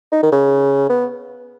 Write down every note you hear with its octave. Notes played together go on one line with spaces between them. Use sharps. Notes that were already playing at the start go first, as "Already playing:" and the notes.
D#4
D#3
C#3
B3